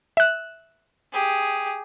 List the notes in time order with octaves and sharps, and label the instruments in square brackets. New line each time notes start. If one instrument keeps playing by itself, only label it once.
[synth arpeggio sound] E5 F#6
[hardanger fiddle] G4 G#4